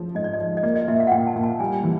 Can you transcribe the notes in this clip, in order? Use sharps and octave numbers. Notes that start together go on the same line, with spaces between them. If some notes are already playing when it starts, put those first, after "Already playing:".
Already playing: F3 G#3 A3 C#4
G#2 D#5
D5
D#5
F3
D#5
A#3 D5
D#5
A#2 E5
F5
F#5
A#2 G5
A5
A#2
A5
G3 G#5
E3